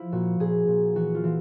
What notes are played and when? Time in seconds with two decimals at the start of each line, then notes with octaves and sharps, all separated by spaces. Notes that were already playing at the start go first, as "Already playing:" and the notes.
Already playing: F3 E4
0.12 A#2 F#4
0.39 A#2 G#4
0.67 A#2
0.95 E3 F#4
1.15 F4
1.24 E3